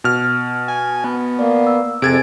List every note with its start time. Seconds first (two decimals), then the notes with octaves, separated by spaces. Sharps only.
0.04 B2 F6
0.68 G#5
1.04 B3
1.39 A#3 D5
1.67 E6
2.02 F2 C3 G#4 A4 G#5 G#6 A6 D7